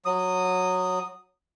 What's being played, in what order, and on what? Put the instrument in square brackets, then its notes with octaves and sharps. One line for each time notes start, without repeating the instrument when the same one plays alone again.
[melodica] F#3 D#6